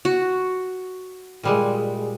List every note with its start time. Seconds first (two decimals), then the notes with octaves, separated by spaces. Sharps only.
0.05 F#4
1.43 A#2 G3 G#3